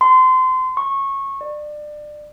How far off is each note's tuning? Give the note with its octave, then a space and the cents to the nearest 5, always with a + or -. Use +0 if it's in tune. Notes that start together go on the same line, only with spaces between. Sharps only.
C6 -25
C#6 -20
D5 +25